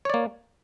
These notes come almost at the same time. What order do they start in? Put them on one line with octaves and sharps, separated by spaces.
C#5 D5 A#3